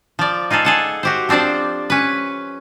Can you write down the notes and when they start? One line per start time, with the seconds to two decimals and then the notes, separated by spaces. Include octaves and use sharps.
0.19 F3 D5
0.51 D#4 F4 G#4 A4
0.65 G#4 A4 F#5
1.03 F#4 G4 C5
1.29 F3 C4 D4 C5 D5
1.90 C#4 B4